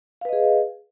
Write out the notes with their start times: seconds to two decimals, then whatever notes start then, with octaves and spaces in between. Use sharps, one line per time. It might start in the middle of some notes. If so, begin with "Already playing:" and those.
0.21 F5
0.25 B4
0.29 D#5
0.33 G#4